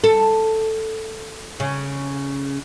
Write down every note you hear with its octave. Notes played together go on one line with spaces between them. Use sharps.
A4
C#3